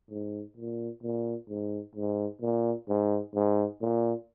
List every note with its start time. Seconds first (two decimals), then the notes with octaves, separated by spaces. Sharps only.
0.11 G#2
0.57 A#2
1.03 A#2
1.49 G#2
1.95 G#2
2.41 A#2
2.89 G#2
3.35 G#2
3.81 A#2